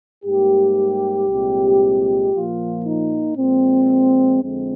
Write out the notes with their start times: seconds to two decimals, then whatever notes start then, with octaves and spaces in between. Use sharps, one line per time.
0.25 G#2 G3 A#3 G4
1.28 C2 A#2 G#3 C4
2.33 A#2 F3 A#3 F4
2.85 D#4
3.37 A#2 F3 G#3 C4
4.41 F2 D3 G#3 C4